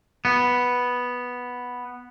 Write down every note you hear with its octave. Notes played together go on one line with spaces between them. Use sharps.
B3